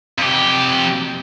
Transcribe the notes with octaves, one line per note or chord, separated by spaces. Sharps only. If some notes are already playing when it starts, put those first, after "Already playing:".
F2 G4